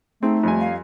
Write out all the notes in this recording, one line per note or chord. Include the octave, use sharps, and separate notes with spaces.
A3 C4 D#4 G#4
F2 G3 G#5
F5